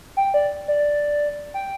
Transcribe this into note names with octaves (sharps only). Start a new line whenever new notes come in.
G5
D5
D5
G5